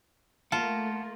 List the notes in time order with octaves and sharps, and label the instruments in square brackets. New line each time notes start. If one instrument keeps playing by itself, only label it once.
[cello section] A3 A#3 [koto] F4 [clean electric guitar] F#5 A5